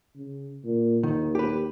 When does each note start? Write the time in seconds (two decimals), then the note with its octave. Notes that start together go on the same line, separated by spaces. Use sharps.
0.16 C#3
0.64 A#2
1.03 D#2 D#3
1.35 G4 B4